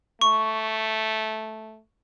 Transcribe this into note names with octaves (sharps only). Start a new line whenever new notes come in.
A3 C#6